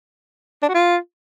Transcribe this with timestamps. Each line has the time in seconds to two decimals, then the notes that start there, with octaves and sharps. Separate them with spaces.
0.63 D4
0.69 F#4
0.74 F4